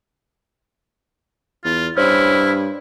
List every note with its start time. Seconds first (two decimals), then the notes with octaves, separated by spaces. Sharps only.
1.64 E2 F4
1.97 G2 C#4 E4 C5 F6